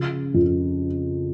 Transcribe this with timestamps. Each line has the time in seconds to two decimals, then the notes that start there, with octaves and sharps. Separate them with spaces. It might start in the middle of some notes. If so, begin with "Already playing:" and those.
Already playing: C#3 F3
0.34 F2